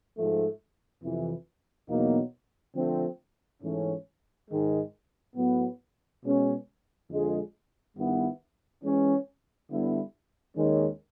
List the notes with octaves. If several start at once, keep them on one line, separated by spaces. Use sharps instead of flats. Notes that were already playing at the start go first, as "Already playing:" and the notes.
G#2 F3 A3
F2 C3 E3
E2 B2 F#3 A#3 D#4
D3 F3 A3 C4
G#2 E3 A3 C#4
G#2 D#3 G#3
A2 F#3 B3
B2 G#3 C#4
F2 D3 F3 G#3
G2 D#3 G3 B3 E4
E3 G#3 C#4
D3 G3 B3 E4
D#2 D#3 G#3 C#4